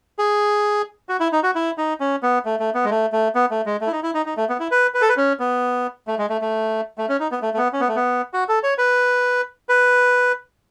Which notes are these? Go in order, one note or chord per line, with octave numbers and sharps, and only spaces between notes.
G#4
F#4
E4
D#4
F#4
E4
D#4
C#4
B3
A3
A3
B3
G#3
A3
A3
B3
A3
G#3
A3
E4
D#4
E4
D#4
D#4
A3
B3
E4
B4
B4
A4
B4
C#4
B3
A3
G#3
A3
A3
A3
C#4
D#4
B3
A3
A3
B3
C#4
B3
A3
B3
F#4
A4
C#5
B4
B4